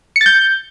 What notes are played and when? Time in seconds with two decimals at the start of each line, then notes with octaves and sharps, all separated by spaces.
0.16 C#7
0.21 A6
0.26 G6